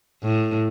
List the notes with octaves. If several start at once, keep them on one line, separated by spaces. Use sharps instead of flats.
A2